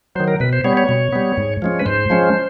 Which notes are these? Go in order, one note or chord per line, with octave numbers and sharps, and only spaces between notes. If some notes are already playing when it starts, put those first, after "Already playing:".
D#3 F#3 C5
A#4
B2 B4
C5
G3 B3 C#5
C#5
B2
G3 B3
G#2
F3 G#3 C#4
B4
G#2 C5
F3 G#3 C#4